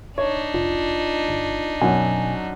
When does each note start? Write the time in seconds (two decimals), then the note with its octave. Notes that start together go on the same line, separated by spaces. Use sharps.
0.18 D4 D#4 C#5
0.54 F1 F4
1.28 G1
1.82 F#2 B2 F#3 G#5